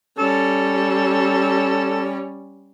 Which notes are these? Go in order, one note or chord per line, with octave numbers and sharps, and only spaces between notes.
G3 C#4 A4